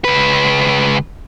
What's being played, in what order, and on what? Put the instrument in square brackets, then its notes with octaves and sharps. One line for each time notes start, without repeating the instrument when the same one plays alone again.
[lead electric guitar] C#2 B4